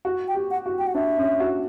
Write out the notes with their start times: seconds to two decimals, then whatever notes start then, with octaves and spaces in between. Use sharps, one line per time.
0.05 F#4
0.28 G5
0.35 G4
0.51 F#5
0.66 F#4
0.79 G5
0.87 F#5
0.94 D4 E5
1.18 C#4
1.40 F#4